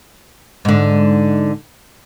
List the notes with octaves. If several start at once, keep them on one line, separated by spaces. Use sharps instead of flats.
G#2 D3